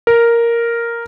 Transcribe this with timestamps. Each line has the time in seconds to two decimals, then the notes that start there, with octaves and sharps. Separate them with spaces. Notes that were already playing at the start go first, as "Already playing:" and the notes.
0.07 A#4